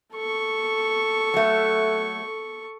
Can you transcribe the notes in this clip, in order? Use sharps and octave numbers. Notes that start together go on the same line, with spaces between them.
A4 C#6
F#3 A3